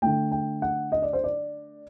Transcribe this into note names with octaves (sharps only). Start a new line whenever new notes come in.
D3 A3 G5
G5
F#5
D#5
D5
C5
D5